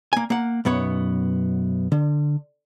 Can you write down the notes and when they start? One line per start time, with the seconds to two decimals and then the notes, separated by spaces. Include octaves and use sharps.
0.13 A#3 G#5
0.30 A#3 F#5
0.65 B1 F#2 B3 C#5
1.92 D3